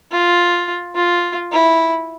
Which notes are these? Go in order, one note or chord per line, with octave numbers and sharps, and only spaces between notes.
F4
F4
E4